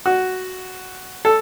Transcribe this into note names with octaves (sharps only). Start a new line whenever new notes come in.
F#4
A4